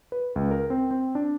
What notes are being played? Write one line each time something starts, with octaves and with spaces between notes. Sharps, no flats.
B4
C#2
A#4
C4
C4
D4